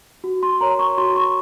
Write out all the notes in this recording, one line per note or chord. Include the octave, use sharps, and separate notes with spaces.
F#4
C6
A#4 C#5 A#5
C#6
F#4 C6
C#6